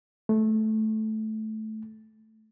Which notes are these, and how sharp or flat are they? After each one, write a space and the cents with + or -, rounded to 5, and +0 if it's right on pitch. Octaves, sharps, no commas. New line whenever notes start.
A3 -15